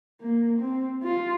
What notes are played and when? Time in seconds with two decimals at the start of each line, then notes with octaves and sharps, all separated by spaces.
0.21 A#3
0.59 C4
1.03 F4